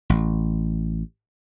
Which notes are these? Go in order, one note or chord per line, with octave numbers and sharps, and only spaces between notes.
A1